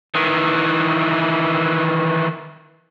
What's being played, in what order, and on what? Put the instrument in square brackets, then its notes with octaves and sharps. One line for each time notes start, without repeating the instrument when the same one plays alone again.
[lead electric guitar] D#3 E3